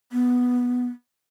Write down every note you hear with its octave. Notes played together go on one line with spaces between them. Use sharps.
B3